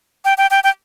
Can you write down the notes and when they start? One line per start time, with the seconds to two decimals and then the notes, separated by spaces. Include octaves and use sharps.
0.25 G5
0.38 G5
0.51 G5
0.64 G5